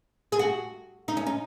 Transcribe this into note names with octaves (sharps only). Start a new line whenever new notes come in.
G#4
F#4
D#4
C#4
D#4